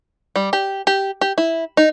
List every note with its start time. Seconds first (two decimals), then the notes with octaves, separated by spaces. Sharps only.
0.36 G3
0.53 G4
0.87 G4
1.21 G4
1.38 E4
1.77 D#4